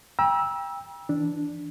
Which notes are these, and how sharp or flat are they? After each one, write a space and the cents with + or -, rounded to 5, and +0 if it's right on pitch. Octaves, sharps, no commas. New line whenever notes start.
G5 +25 A#5 +45 E6 -5
E3 +0 D4 +0